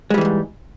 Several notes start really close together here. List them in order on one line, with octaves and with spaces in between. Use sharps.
G#3 G3 E3 F2 G#2